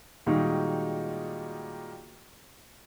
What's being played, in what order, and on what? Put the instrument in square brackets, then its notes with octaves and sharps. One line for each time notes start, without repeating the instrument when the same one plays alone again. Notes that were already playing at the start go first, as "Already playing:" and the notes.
[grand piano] A#2 D#3 G3 G#3 D#4 F#4